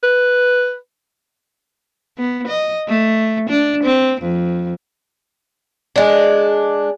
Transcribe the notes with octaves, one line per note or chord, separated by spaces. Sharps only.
B4
B3
D#5
A3
D4
C4
F2
G#3 D4